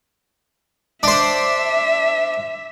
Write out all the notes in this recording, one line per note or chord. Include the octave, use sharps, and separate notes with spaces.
D4 C5 E5